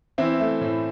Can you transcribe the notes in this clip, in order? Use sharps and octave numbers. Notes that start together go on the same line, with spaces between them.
E3 C4 E4
A3
A2